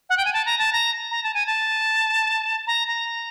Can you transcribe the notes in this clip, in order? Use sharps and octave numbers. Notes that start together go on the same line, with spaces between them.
F#5
G5
G#5
A5
A#5
A5
A#5
A#5
A5
G#5
A5
A#5
A#5